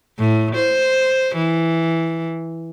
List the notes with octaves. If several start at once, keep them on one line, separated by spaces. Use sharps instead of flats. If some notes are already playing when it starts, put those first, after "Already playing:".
A2
C5
E3